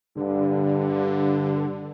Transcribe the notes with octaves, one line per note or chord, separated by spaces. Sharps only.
G2 D3